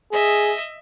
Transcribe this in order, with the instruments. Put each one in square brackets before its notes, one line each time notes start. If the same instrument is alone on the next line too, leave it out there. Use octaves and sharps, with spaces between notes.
[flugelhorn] G#4 [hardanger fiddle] D#5 E5